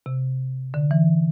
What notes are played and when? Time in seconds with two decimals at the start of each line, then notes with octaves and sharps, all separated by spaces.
0.06 C3
0.74 D3
0.91 E3